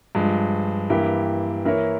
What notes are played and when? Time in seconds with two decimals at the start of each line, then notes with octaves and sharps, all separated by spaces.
0.15 G2 F3 G#3
0.90 G2 E3 A#3 E4 G4
1.65 E3 A#3 E4 A#4 C#5